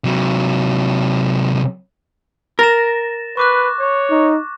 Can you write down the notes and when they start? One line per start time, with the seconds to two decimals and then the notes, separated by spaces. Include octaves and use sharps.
0.04 C3 F#3
2.59 A#4 A6 A#6 E7
3.37 B4 C#6 D6 F#6
3.80 C#5
4.11 D#4